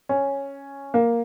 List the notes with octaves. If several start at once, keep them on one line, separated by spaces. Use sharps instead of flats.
C#4
A#3